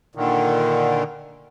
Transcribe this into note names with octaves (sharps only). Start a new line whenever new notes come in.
A#2 D3 D#3